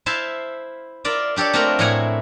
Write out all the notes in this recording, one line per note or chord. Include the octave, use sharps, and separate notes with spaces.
E4 C5 E5 F5 A5
F4 A#4 D5 E5
D4 G4 A4 C#5 D5
A3 A#3 C4 F4 F#4 A#4
A2 A3 E4 F#5 G#5 A#5